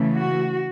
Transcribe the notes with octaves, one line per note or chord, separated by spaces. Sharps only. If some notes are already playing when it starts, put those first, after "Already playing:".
Already playing: C#3 E3 A3
F#4